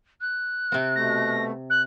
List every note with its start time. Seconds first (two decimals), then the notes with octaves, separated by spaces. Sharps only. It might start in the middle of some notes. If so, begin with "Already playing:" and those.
0.21 F#6
0.72 C3 C4
0.95 B2 A3 A#6
1.70 F#6